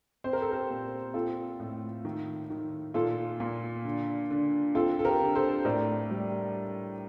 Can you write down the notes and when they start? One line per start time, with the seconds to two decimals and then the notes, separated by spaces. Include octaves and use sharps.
0.24 C4 C5
0.33 A#4
0.42 A4
0.51 G4 A#4
0.70 A#2
1.14 C4 F4 A4
1.60 A2
2.05 D#3
2.50 D#3
2.94 A#2 F4 A4
3.40 A#2
3.85 D3
4.30 D3
4.75 C4 F4 A4
4.99 A4
5.05 G4 A#4
5.21 D3
5.35 A4 C5
5.65 A2 A#4 D5
6.11 G3